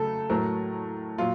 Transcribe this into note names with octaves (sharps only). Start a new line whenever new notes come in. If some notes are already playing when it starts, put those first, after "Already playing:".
Already playing: C#3 F#3 A3 A4
A2 F#3 A3 A#4
A#2 F#3 F4